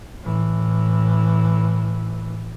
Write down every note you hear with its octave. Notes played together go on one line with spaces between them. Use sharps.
A2 E3